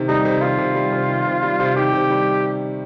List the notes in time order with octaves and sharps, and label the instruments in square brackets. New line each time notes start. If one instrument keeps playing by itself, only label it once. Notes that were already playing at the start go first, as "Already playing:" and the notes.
Already playing: [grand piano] C3 D#3
[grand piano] G3 [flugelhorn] D#4
[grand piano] C3
[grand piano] D#3 [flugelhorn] F4
[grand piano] C3
G3
C3
D#3
C3
G3
C3
[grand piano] D#3 [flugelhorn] G4
[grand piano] C3
G3